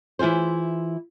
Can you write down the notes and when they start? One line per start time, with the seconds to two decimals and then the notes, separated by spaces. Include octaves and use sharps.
0.19 E3 E4 F4 G#4 C5